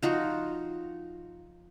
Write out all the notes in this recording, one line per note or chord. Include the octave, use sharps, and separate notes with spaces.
F3 D#4 F4 F#4